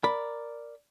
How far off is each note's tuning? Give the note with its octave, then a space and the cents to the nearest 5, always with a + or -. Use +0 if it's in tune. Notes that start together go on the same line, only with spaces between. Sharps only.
A#4 +0 D5 +0 B5 +0